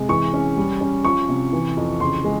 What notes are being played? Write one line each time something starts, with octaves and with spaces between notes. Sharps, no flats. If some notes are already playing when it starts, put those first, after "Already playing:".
Already playing: C3 G#3
E3 C#6
C#4
G3
C#4
F3 C#6
C3
E3
F2
C#3 C6
G#3